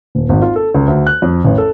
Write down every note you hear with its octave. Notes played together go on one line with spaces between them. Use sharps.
D#1
G#1
F4
A4
C#2
D2
F#6
F2
A1
A4